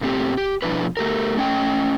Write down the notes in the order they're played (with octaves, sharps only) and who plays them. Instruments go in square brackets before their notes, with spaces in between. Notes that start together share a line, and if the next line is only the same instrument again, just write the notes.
[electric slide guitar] A#2 A3 C4 G4
G4
B2 F3 D4 E4 B4
A3 G4 A#4
A3 C#4 D#5 G5